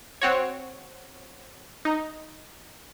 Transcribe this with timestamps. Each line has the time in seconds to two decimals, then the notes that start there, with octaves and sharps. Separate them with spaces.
0.22 C4 F#4 C#5
1.85 D#4